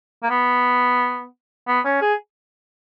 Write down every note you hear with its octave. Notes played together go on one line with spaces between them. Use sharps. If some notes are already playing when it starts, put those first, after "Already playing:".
A#3
B3
B3
C#4
G#4